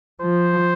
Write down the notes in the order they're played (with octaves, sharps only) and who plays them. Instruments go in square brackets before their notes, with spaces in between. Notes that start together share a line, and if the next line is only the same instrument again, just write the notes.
[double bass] F3 [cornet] C5